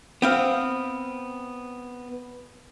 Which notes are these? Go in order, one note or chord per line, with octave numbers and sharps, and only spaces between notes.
B3 C4 F5